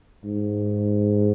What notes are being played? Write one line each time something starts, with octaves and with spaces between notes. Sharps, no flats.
G#2